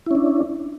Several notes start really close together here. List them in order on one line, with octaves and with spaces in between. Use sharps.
E4 C#4 D4